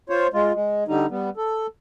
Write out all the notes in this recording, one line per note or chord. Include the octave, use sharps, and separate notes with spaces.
F4 C5 C#5
G#3 F4
G#3
D3 G3 D#4
G3 B3
A4